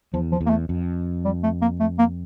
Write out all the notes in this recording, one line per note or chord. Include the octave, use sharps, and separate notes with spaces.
E2 F3
F3
E2
A#3
A3
F2
G3
A3
A#3
A3
A#3